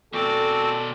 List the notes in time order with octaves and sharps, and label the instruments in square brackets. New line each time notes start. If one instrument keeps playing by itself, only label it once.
[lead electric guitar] B2 D5 [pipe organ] C4 F#4 [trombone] A4